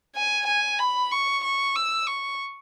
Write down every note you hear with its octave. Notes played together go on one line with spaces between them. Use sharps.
G#5
G#5
B5
C#6
C#6
E6
C#6